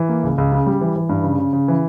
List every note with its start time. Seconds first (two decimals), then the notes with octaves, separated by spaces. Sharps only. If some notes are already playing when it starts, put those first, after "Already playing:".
Already playing: E3
0.09 A#3
0.24 C#2
0.38 C#2
0.52 C#3
0.66 G3
0.81 E3
0.96 E3
1.09 G2
1.24 C#3
1.38 C#3
1.53 C#3
1.68 E3